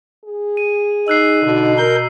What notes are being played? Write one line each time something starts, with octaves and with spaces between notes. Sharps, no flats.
G#4
D#7
D#4 E6 F#6 C7
B2 D3
A#4 G6